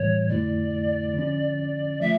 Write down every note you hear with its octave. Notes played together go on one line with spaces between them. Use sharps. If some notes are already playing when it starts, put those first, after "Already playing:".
Already playing: A2 E3 G3 C#5
F2 D3 A3 E4 D5
D3 F3 C#4
F3 A3 E5